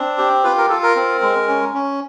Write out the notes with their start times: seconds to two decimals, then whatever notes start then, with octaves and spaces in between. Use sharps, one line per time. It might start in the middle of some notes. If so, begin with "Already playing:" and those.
Already playing: C4 D4
0.18 G4
0.44 F4 B4
0.57 A#4
0.69 F4 A4
0.83 A#4
0.96 C4
1.22 G#3
1.48 C#4
1.74 C#4